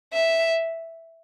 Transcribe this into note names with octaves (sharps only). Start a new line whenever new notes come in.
E5